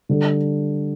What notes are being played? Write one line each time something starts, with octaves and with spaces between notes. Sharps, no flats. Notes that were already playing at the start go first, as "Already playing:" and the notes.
D3 G3 D4 A4